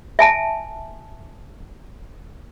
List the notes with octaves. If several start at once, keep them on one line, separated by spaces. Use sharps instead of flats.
E5 G#5 A5